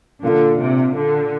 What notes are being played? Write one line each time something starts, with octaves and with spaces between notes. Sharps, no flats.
A#2 D3 A#3 D4 F4
C3
D3